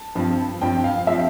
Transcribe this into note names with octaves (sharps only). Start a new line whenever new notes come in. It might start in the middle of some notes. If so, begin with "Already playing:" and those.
Already playing: A5
G2 F3 C4
G2 F3 C4 G5
F5
F3 C4 E5